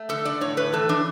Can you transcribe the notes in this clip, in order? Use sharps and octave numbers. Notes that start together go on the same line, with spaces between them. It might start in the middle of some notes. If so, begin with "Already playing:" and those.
Already playing: A3
D3 A4
D3 D5
A2 C#5
A2 B4
E3 A4
E3 D4